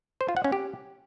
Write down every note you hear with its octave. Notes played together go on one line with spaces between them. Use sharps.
C5
F4
F#5
C#4
G4